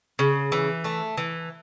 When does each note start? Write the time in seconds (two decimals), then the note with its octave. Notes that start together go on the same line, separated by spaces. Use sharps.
0.19 C#3
0.52 E3
0.84 A3
1.17 E3